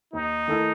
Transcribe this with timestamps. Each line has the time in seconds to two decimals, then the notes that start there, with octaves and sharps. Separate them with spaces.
0.13 D#2 D#4
0.48 D#3 A3 E4